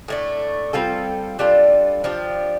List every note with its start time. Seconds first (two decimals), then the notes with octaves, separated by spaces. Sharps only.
0.08 A2 A3 D4
0.73 G3 C4 F4 A4
1.39 G3 D4 F4 A4
2.04 F3 D4 G4